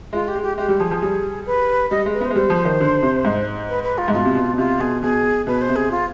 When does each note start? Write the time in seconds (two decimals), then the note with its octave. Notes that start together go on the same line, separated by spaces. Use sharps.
0.13 G#3 F4
0.28 G4
0.35 G#3
0.43 G4
0.58 G#3 G4
0.69 G3
0.80 F3 G#4
0.91 F3
1.03 G3
1.46 B4
1.91 G3 D#5
2.06 G#3
2.14 B4
2.21 B3 C5
2.30 G#3
2.35 G3 C5
2.50 F3
2.65 D#3
2.81 D3
3.02 C3
3.25 G#2
3.69 B4
3.84 B4
3.98 F4
4.08 G#2
4.13 B2 F4
4.25 C3
4.35 B2
4.54 B2
4.58 C3 F4
4.79 B2 G#4
5.02 B2 G#4
5.47 B2 B4
5.61 C5
5.69 C3
5.76 G#4
5.91 F4